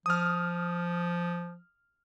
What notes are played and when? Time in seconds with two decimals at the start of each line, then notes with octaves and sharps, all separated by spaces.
0.06 F3 D#6 F6